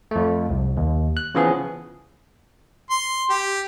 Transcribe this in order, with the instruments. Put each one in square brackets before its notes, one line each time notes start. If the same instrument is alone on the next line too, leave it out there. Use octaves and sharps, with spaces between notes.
[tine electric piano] F2 A3
C2
D#2
F#6
C#3 E3 F3 B3 G#4
[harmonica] C6
G4